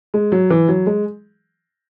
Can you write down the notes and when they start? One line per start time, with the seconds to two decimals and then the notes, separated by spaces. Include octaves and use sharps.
0.14 G#3
0.32 F#3
0.50 E3
0.68 F#3
0.86 G#3